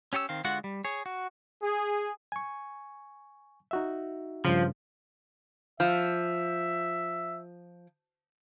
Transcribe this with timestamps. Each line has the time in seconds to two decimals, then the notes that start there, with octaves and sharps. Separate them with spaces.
0.13 C#4 G4 C#5 G#5 E6
0.29 D#3 C4 F5
0.44 D3 G#3 F4 F#4 F#5
0.64 G3
0.85 G#4 C#5
1.06 F#4
1.62 G#4
2.32 G#5 C#6
3.71 D#4 F#4 E5
4.45 G2 C#3 F3
5.80 F3 E5